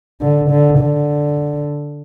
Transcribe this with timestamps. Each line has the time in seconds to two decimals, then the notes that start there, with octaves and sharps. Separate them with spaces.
0.21 D3
0.50 D3
0.78 D3